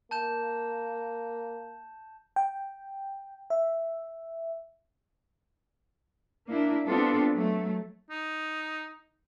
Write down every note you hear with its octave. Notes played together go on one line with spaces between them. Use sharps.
A#3 A5 G6 E7
G5
E5
A#3 D4 E4
G3 B3 C4 D4 F4 A4
F#3 A3
D#4